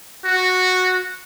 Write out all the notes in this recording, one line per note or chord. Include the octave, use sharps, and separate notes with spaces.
F#4